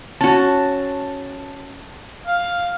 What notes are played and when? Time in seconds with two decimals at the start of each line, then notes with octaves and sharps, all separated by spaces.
0.21 C#4 F#4 A5
2.26 F5